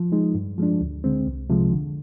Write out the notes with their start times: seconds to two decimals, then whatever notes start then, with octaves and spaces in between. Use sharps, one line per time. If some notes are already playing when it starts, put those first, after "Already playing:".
Already playing: F3
0.12 G#3 D#4
0.35 G2
0.58 F3 G#3 D4
0.81 D2
1.04 D3 G#3 C4
1.27 C2
1.50 C3 F3 G#3
1.73 D3